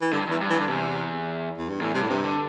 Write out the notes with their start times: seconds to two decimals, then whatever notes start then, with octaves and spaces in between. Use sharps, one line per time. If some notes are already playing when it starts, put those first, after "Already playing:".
0.01 E3
0.12 G2 D3
0.27 E2 E3
0.41 G2
0.50 E3
0.54 G2
0.60 D3
0.69 E2 C3
1.57 E2
1.69 G2
1.81 E2 A2
1.94 G2 C3
2.02 A2
2.09 G2 C3
2.24 D3